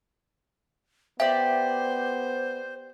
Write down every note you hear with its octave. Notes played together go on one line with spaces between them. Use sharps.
B3 G4 C5 D5 E5